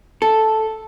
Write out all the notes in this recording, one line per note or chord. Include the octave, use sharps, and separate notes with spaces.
A4